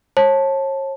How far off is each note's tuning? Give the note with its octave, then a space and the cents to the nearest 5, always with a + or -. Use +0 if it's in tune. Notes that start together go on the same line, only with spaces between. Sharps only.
C#5 -40 A5 +0